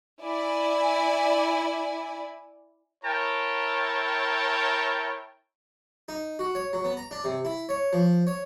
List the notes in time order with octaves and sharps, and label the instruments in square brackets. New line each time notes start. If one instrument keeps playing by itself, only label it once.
[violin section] E4 D5 G#5
[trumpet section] E4 A#4 C#5 G5 A5
[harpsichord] D#4
F#4
C#5
F#3
B3
A#5
D4
C3
E4
C#5
F3
C#5